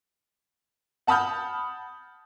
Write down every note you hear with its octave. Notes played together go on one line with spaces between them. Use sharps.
F#5 A5 B5 D#6 F6 G6